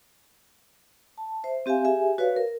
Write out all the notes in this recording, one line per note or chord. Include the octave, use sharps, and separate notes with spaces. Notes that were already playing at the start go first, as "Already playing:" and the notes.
A5
C5 E5
C4 G4 E5 F5 G#5
G4 G#4 E5 G#5
F#4 B4 C#5 D5 F5
A#4